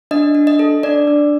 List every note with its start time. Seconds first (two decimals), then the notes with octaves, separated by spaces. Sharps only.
0.11 D4 D#5
0.35 D4
0.47 D#5
0.59 A4
0.83 D4 D5
1.07 D4